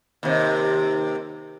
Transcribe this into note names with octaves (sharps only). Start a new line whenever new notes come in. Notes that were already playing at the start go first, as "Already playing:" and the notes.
D#2 C3